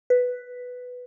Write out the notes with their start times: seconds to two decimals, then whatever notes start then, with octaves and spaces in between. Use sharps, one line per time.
0.10 B4